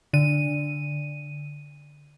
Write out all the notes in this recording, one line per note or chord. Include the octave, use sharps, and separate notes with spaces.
D3 D#7